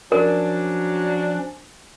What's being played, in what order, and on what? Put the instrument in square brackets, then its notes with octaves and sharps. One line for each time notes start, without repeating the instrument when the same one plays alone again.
[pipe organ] F3 C#4 [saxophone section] F#3 D4 [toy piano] A#4